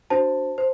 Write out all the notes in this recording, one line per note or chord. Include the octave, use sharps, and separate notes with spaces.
D4 F#4 C5 A5
C5